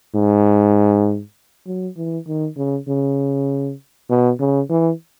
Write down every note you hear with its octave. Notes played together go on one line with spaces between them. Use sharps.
G#2
F#3
E3
D#3
C#3
C#3
B2
C#3
E3